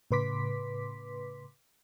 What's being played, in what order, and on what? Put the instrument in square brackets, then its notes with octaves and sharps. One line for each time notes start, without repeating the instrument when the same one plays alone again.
[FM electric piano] A2 C#3 B4 C6 D6 B6